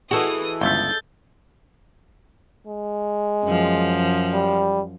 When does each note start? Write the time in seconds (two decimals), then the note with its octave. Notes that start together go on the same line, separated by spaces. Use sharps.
0.11 E3 F#4 G#4 A4 D#5 D#6
0.61 G1 C#2 E5 G6 A6
2.67 G#3
3.44 F#2 F3
4.34 G3